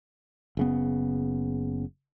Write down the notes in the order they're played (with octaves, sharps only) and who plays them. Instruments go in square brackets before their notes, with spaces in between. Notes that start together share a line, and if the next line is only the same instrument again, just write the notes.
[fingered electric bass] F#1 C#3 B3